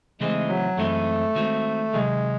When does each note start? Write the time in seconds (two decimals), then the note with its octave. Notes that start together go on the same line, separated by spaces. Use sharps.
0.21 C#3 E3 G#3 A3 C4 D#4
0.49 F#3
0.77 F#2 E3 G#3 A3 C4 D#4
1.35 D#3 G#3 C4 D#4 F#4
1.93 C3 D#3 F#3 G#3